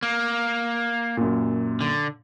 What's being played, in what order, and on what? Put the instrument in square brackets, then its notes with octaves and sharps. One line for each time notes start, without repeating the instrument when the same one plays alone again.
[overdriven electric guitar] A#3
[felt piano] F#2 A#2
[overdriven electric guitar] D3